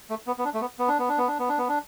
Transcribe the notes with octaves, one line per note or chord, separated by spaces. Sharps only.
A3
B3
B3
D4
A3
B3
B3
D4
B3
D4
B3
D4
B3
D4
B3
D4